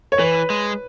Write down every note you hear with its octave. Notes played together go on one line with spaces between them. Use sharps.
C#5
E3 B4
G#3